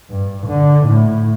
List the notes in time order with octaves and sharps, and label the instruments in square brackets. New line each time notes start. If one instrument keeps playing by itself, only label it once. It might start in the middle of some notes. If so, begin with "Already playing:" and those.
[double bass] G2
D3
A2